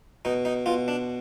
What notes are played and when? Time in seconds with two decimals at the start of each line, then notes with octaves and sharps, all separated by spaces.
0.25 B2 D#4
0.45 D#4
0.66 B2 F4
0.88 D4